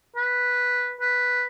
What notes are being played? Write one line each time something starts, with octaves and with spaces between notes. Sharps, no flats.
B4
B4